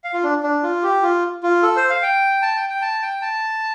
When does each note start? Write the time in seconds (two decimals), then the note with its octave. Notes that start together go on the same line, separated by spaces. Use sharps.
0.04 F5
0.13 F4
0.24 D4
0.43 D4
0.63 F4
0.83 G4
1.02 F4
1.43 F4
1.63 A4
1.76 C5
1.89 F5
2.03 G5
2.42 A5
2.56 G5
2.69 G5
2.82 A5
3.02 G5
3.22 A5